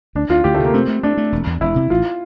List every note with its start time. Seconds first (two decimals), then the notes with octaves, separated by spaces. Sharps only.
0.15 D2 D4
0.29 D2 F4
0.44 D2 G4
0.54 A3
0.60 C3
0.65 A#3
0.74 A3 C4
0.88 A3
1.03 A3 D4
1.17 A3
1.32 E1
1.47 E2
1.61 E1 E4
1.76 C3
1.90 A1 F4